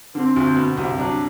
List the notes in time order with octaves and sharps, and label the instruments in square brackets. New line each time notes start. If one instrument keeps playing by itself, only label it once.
[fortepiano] D3 [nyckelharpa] C4
[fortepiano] D2
B2
C2
[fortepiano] F#3 [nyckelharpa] D4